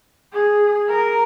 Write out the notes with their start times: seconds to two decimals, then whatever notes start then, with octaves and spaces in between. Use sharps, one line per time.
0.33 G#4
0.89 A#4